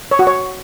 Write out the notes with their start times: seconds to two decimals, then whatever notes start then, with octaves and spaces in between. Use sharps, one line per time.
0.11 C#5
0.19 F#4
0.27 C#5